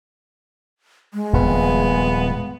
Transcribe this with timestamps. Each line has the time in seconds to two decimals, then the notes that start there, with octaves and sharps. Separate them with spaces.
1.14 G#3
1.33 D#1 F2 B3